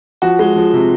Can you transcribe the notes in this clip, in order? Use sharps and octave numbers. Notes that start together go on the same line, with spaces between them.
F3 F#4
G#3
F3
C3